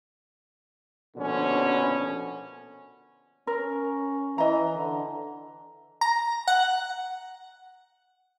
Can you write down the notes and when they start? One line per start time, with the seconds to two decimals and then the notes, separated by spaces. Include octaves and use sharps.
1.17 A#1 B2 D3 C#4
3.47 C#4 A#4
4.38 E3 D#5 A#5
4.75 D3
6.01 A#5
6.48 F#5